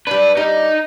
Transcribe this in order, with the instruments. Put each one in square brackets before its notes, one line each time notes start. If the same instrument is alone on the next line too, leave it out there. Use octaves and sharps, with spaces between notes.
[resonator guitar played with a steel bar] G3 D4 [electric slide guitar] B4
[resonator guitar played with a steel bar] G3 G4 [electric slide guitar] D#4